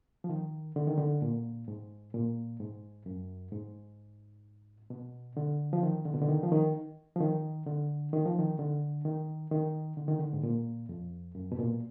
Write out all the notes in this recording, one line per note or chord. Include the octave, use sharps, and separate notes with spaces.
F3
D#3
D3
D#3
D3
A#2
G#2
A#2
G#2
F#2
G#2
B2
D3
F3
D#3
D3
B2
D3
D#3
F3
D#3
F3
D#3
D3
D#3
F3
D#3
D3
D#3
D#3
D3
D#3
D3
G#2
A#2
F2
F#2
B2
A#2